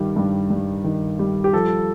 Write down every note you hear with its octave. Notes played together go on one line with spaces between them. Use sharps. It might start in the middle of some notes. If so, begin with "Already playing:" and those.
Already playing: G2 D#3 G3
G2
G2
D#3
G3
G4
F3 A4